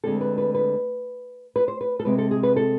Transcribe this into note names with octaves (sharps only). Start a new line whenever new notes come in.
D2 D3 G#3 C4 A4
B4
B4
B4
B4
C5
B4
A4
C3 G#3 C4 B4
A4
G#4
B4
A4